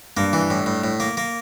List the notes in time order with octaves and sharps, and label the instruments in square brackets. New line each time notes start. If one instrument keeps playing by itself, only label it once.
[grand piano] G2 [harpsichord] A#3
[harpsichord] E3
A2
A2
A2
A#3
A#3